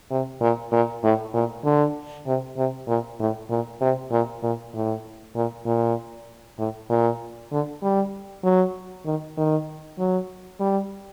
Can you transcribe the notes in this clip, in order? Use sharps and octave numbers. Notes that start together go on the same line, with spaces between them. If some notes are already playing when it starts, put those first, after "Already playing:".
C3
A#2
A#2
A2
A#2
D3
C3
C3
A#2
A2
A#2
C3
A#2
A#2
A2
A#2
A#2
A2
A#2
D3
G3
F#3
D#3
D#3
F#3
G3